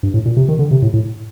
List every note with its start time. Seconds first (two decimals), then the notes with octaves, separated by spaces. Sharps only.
0.03 G2
0.14 A2
0.26 A#2
0.37 C3
0.49 D#3
0.59 D3
0.71 C3
0.82 A2
0.94 A2